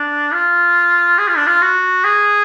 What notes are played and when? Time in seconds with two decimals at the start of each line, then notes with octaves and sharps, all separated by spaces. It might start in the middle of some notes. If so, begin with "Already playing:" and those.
Already playing: D4
0.33 F4
1.19 G#4
1.28 F4
1.37 D4
1.47 F4
1.62 F#4
2.04 G#4